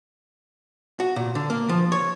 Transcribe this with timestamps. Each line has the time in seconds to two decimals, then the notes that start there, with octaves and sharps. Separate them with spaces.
1.00 F#4
1.16 A#2
1.35 D3
1.50 A#3
1.69 F3
1.92 C#5